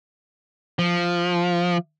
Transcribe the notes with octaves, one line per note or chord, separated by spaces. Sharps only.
F3